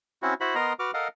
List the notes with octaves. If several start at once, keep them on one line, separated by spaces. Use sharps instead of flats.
C4 C#4 E4 F#4
E4 F#4 C5 B5
B3 A#4 D#5 A#5 C6
F#4 B4 D6 F6
A4 A#4 D#5 F5 F#5